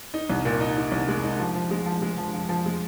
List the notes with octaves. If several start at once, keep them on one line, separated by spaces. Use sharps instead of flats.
D#4
C2
A#2
D#4
D#4
C2
G#3
D#4
F3
F3
G#3
F3
G#3
F3
F3
F3
G#3